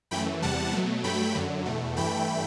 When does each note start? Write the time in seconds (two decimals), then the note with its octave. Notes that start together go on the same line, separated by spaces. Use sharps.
0.11 F#2 E3 A3 G5 B5
0.42 E2 C3 G3 F#5 A5
0.73 B2 F#3 A3
1.04 G2 F#3 A3 G5 B5
1.35 F#2 D3 F#3
1.65 E2 B2 A3
1.96 G2 E3 A3 G5 B5